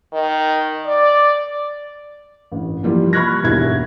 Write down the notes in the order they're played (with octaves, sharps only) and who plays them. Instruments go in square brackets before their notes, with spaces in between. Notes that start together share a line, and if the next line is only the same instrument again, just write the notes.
[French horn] D#3
D5
[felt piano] A1
E3 F3 G3 A#3 F4
B5 C#6 F6 F#6 G#6 A#6
E1 D#2 G3 E4 G#6